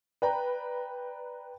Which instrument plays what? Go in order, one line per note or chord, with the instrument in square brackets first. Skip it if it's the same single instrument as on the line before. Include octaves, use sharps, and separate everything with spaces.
[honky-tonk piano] B4 [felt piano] D5 G5 A#5